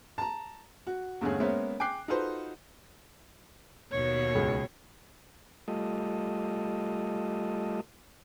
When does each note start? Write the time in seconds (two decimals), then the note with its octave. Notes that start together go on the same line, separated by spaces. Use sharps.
0.18 A5 A#5
0.87 F#4
1.21 E2 G2 D3 A3 C#4 G#4
1.40 G#3 A#3 B3 C#4 C5 E5
1.80 G5 G#5 D6 F#6 C7
2.08 D#4 F4 F#4 A4 B4 C5
3.92 D#2 B2 C#5
4.35 C#2 G#4
5.68 G3 A3 F4 A4 D#5